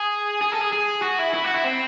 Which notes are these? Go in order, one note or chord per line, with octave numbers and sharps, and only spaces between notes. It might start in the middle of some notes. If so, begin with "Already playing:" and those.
Already playing: G#4
G#4
A4
G#4
G#4
F#4
E4
E4
F#4
E4
C4